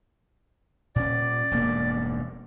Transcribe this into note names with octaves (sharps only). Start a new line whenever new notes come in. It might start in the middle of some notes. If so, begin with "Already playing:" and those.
A#2 C#4 D5
E1 G2 A#3